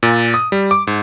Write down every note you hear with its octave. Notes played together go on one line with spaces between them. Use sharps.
A#2
D#6
G3
D6
G#2